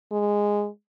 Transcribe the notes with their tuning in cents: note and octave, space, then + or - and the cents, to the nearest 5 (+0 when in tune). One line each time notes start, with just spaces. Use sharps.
G#3 -10